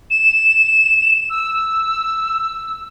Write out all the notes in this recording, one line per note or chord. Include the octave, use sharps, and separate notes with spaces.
E7
E6